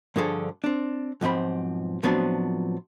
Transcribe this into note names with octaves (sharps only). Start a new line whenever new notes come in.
G2 D3 F3 G#4 A4 C5
C4 D4
B1 G#2 F3 C4 B5
A2 F3 F#3 B3 C4 D4